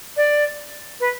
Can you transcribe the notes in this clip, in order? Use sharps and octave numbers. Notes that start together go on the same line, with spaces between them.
D5
B4